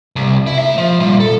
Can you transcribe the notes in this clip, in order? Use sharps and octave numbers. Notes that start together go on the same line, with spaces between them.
C2
E4
A2 E5
F3
A#2 G3
A4